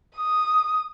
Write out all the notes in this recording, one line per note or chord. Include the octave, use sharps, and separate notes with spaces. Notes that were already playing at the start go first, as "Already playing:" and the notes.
D#6